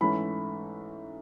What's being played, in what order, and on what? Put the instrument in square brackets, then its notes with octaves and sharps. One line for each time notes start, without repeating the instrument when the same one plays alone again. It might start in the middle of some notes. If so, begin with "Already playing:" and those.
[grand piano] G#2 E3 A3 C#4 B5